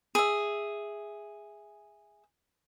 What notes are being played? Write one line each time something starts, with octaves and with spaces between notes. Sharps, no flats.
G#4 E5